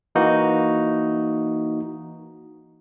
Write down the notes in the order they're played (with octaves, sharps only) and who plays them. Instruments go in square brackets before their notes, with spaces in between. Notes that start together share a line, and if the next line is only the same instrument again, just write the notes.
[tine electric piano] E3 A#3 D#4 F#4